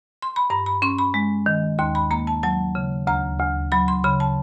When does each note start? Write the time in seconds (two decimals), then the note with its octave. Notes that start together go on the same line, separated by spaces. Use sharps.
0.22 C6
0.36 B5
0.50 G2 A#5
0.66 B5
0.82 C#4 C6
0.99 B5
1.14 G#3
1.46 D#3
1.79 D#2 C6
1.95 B5
2.11 A#3 A#5
2.27 A5
2.43 F#3 A5
2.75 C#3
3.07 D2 A#5
3.39 D2
3.72 F#3 B5
3.88 C6
4.04 C#3 B5
4.20 A5